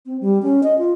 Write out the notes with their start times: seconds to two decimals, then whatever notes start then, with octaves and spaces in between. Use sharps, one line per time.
0.06 C4
0.21 G3
0.42 C#4
0.63 D#5
0.78 F4